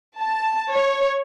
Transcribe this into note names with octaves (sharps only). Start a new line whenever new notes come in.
A5
C#5